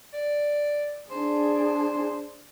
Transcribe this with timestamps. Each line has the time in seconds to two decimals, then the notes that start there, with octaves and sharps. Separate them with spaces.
0.14 D5
1.11 D4 G#4 C5